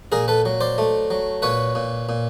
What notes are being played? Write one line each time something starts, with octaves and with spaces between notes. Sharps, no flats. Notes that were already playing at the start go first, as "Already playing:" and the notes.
A#2 G#4 A#4
A4 B4
F#3
C5 D5
A3
F#3
A#2 B4 C#5
A#2
A#2